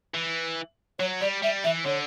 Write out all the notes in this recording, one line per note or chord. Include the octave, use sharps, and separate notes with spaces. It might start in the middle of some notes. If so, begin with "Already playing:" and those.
E3
F#3 C#5
G3 D5
G3 E5
E3 E5
D3 C#5